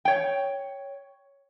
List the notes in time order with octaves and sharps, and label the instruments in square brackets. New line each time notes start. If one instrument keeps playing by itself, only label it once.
[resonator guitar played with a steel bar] C#5 G5